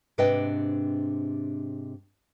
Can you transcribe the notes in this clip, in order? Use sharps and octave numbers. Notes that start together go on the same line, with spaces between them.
G#2 C3 D4 B4 D#5 G5